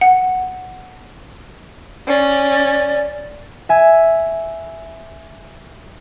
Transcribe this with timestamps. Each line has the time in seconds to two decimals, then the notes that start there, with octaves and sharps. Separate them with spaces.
0.01 F#5
2.07 C#4 D5
3.69 E5 G#5